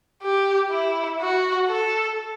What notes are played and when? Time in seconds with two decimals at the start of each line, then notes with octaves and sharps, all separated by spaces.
0.22 G4
0.71 E4
1.20 F#4
1.69 A4